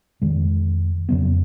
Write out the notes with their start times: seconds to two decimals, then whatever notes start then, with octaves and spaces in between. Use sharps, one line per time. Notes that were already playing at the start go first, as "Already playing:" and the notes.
0.22 F2 D#3 G#3
1.09 F2 C#3 F#3 B3